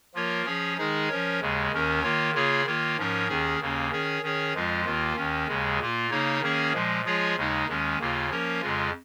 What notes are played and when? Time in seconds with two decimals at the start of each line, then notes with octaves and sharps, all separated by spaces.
0.15 F3 A#3 F4 A#4 C#5
0.46 F3 C#4 G#4 C#5
0.77 D#3 G#3 D#4 G#4
1.09 F3 C#4 A#4 C#5
1.40 D#2 C#3 G#3
1.72 D#2 D#3 C#4 A#4
2.03 D#3 A#3 F4 C#5
2.34 C#3 A#3 F4 G#4 C#5
2.66 D#3 A#3 F4 C#5
2.97 G#2 F3 C#4 A#4 C#5
3.28 D#2 D#3 C#4 G#4
3.60 D#2 C#3 A#3 C#4
3.91 D#3 C#4 G#4 C#5
4.22 D#3 C#4 G#4 C#5
4.54 F2 F3 G#3 F4
4.85 D#2 D#3 A#3 F4
5.16 D#2 D#3 C#4
5.48 D#2 C#3 G#3
5.79 A#2 A#3 F4
6.10 C#3 A#3 D#4 C#5
6.42 D#3 A#3 C#4 G#4 C#5
6.73 A#2 F3 G#3
7.04 F3 G#3 F4 G#4 C#5
7.36 D#2 C#3 G#3 D#4
7.67 D#2 D#3 G#3 C#4
7.99 D#2 C#3 A#3 F4
8.30 F3 A#3 C#4 A#4 C#5
8.61 F2 C#3 G#3 F4